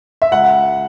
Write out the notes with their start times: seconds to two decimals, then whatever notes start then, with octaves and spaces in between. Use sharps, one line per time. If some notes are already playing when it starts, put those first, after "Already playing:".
0.22 E5
0.32 C#2 F#5